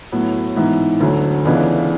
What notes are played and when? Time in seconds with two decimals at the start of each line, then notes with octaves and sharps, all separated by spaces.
0.12 A2 F#3 B3
0.56 G#2 E3 B3 E4
1.00 D2 D3 F#3
1.45 C#2 C#3 E3 B3 D4